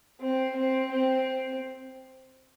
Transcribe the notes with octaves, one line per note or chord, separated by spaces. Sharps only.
C4
C4
C4